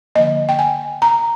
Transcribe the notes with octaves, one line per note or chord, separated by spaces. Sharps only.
D3 F3 A#3 D#5
G5
G#5
A#5